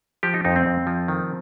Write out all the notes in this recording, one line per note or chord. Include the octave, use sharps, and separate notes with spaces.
F3 G4
D#4
F2 D#4
C4
F2
F3
D#3